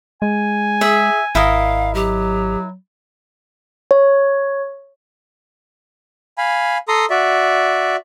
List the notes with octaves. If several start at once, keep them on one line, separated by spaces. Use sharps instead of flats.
G#3 G#5
G#4 E5
G#1 E4 A#4 D#5 F5
F#3 G4
C#5
F5 G#5 B5
A4 A#5 C6 D#6
F#4 D5 E5